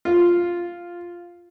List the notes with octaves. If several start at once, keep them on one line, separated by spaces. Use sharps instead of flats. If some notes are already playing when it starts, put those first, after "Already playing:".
F4